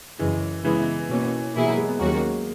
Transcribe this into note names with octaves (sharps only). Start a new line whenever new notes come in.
F#2 C#3 E3 G#3
C#3 E3 G#3 B3 E4
B2 A#3 C#4
B2 E3 A#3 E4 G#4
F#3
G#3
B3
D#2 D#3 F#3 A#3 C#4 F#4
G#3
A#3